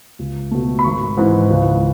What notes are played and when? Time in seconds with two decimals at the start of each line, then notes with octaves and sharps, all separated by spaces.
0.19 C#2
0.51 B2 A3
0.79 B5
0.84 G#1 C#6
1.17 G#2 E3
1.50 C#2